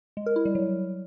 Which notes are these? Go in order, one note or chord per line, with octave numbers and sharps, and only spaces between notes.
G#3
A#4
E4
G3
F#3